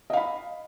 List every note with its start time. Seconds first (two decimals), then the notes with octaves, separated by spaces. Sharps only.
0.10 D#5
0.13 F5
0.17 B5